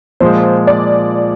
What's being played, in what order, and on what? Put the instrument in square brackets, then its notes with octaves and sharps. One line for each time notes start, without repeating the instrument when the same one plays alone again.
[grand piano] A#2 F3 G#3 [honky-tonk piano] C5
[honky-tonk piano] D5